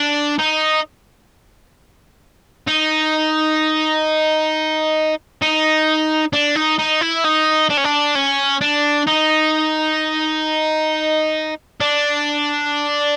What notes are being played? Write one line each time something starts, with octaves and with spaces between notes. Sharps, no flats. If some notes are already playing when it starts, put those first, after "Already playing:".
Already playing: D4
D#4
D#4
D#4
D4
D#4
D#4
E4
D#4
D4
C#4
D4
C#4
D4
D#4
D4